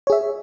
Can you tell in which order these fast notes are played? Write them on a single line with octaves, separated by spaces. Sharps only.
C#5 G#4 E5